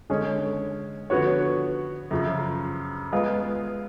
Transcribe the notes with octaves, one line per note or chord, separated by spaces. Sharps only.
D3 G#3 C#4
D3 F3 B3 F#4 C#5
F#2 C#3 F3
G#3 B3 F4